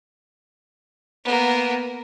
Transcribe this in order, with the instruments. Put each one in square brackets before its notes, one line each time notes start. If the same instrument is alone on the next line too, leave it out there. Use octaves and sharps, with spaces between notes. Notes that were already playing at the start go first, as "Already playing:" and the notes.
[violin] A#3 B3